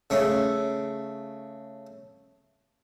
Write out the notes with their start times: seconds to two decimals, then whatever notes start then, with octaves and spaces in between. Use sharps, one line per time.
0.10 C#3 A3